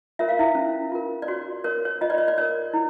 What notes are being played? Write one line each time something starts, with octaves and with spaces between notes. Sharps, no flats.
F4 A#4 C#5 E5
F5
E4 E5
C#4
F4 A#4
D5
F#4 C#5
A#4 C#5
C#5
F4 D#5
D5
C#5
D5
A#4 C#5
E4